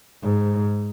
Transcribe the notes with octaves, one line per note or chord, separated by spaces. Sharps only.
G#2